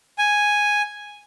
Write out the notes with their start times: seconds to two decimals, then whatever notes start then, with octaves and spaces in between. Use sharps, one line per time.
0.18 G#5